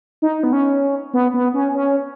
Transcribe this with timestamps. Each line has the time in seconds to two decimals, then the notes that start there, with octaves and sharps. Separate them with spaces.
0.22 D#4
0.43 B3
0.53 C#4
1.14 B3
1.34 B3
1.54 C#4
1.75 C#4